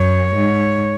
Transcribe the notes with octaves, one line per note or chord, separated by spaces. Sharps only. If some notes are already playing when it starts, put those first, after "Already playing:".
Already playing: F#2 C#5
G#2